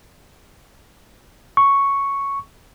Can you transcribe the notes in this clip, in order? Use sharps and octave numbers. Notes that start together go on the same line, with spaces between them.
C#6